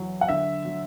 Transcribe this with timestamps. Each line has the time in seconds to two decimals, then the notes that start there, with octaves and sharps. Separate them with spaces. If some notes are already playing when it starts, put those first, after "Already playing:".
Already playing: E2 F#3
0.21 F#5
0.28 D3 E5
0.65 F#3